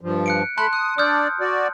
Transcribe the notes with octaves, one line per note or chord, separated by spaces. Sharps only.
G2 F3
F#6 C#7 D7
A3 A5 B5 C6 F#6
D#6 F#6
D4 D5 D#6 F6 G6
F#4 D5